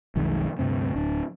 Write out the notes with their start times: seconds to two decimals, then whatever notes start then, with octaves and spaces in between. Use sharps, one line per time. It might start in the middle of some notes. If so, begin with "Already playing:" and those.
0.16 B1 F2 D#3 G#3
0.59 D2 G2 C3 C4
0.96 D1 D4